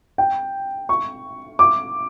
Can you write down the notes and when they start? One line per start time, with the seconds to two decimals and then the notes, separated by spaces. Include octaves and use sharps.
0.18 G5
0.89 C#6
1.59 D6